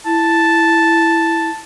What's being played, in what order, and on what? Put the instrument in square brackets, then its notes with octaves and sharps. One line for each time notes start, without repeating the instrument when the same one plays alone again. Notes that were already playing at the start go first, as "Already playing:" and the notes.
[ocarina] E4 [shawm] A5